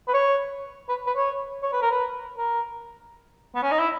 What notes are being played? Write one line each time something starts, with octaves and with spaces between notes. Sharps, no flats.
B4
C#5
B4
B4
C#5
C#5
B4
A#4
B4
A#4
B3
C#4
D#4
E4